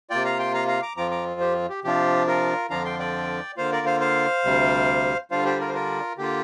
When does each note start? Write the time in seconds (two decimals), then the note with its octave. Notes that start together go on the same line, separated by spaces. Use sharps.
0.10 C3 A#3 F4 D5 G5
0.25 F5 A#5
0.39 G5 C6
0.54 F5 A#5
0.68 F5 A#5
0.82 A#5 D6
0.97 F2 F3 C4 F4 A#5 D6
1.11 A#5 D6
1.40 G4 C5
1.69 G4
1.84 C3 F3 D4 F4 G4
2.27 F4 A#4
2.70 F2 D3 F3 D4 F4 F5 A#5
2.85 G5 C6
2.99 D5 G5
3.57 D3 A#3 F4 C5 F5
3.72 A#4 D5
3.86 C5 F5
4.00 C5 F5
4.45 D2 C3 G3
5.31 D3 G3 D4 F4 C5 F5
5.45 G4 C5
5.60 F4 A#4
5.68 C5
5.74 F4 A#4
6.18 D3 A#3 F4 G4